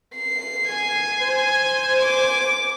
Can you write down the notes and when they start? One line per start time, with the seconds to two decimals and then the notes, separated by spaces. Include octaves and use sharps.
0.16 C7
0.68 G#5
1.20 C5
2.00 D6